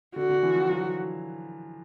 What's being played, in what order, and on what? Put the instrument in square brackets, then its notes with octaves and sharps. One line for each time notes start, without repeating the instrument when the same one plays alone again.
[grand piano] D3 [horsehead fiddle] F#4
[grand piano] D3
E3
F3
F#3